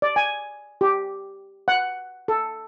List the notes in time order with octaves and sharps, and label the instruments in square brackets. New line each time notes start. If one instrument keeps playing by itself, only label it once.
[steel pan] D5
G#5
G4
F#5
A4